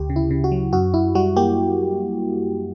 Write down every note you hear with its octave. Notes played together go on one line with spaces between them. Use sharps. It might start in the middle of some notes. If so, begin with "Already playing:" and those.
Already playing: D2 G4
C#3
E4
C#3
F#4
F#3
F#2 F#4
F#2 E4
G3 F#4
A#3 G4